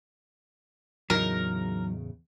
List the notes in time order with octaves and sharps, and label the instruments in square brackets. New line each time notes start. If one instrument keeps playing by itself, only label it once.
[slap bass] E2 A2 C#3 [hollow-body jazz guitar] F#3 D#4 [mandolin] A#4